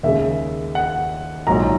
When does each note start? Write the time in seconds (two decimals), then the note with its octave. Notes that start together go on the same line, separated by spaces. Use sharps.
0.03 D#2 C#3 G#3 E5
0.75 F#5
1.47 A#1 G#2 D#3 F#3 A#5